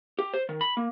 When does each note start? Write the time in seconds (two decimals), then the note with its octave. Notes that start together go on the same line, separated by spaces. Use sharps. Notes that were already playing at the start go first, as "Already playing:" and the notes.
0.19 G4
0.34 C5
0.49 D#3
0.61 B5
0.77 A#3